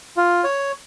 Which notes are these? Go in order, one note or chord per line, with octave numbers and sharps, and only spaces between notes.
F4
C#5